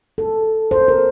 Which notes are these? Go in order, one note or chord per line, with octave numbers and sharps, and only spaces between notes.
A4
C5
A#4